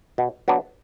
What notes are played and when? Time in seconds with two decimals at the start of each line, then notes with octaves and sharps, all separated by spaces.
0.18 B2
0.48 F#3 B3 D4